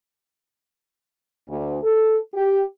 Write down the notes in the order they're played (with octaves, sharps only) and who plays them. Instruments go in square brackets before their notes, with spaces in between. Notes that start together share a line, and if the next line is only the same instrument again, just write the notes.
[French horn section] D2
A4
G4